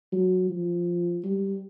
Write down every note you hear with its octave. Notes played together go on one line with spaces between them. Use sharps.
F#3
F3
G3